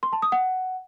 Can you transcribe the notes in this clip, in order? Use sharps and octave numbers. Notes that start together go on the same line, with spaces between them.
C6
A5
D#6
F#5